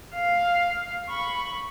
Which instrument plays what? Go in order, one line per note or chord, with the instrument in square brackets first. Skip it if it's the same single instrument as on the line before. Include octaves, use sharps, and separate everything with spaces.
[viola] F5
B5 C#6